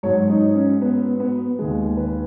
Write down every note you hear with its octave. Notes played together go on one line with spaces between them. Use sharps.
G#2 F#3 C#5
D#4
C#4
B3
B3
D#2 D#3 G#3
B4